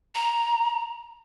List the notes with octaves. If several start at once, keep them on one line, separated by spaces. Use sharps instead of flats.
A#5